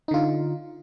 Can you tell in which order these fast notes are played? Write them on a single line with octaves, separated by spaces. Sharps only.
D#4 D3 F4